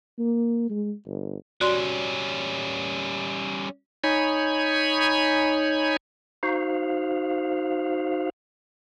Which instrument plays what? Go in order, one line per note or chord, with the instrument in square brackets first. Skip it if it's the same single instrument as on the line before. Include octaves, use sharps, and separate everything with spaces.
[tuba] A#3
G#3
G1
[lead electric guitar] G3 C#4 [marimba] F#4 D5 C6
[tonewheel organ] D#4 C#5 G#5 B5
D#4 F#4 C5 F5